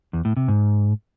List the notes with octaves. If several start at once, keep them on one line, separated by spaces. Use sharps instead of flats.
E2
A2
C3
G#2